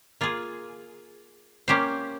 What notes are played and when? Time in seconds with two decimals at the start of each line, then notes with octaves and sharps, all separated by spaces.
0.21 A#3 F4 G#4
1.68 A#3 C#4 G4 C5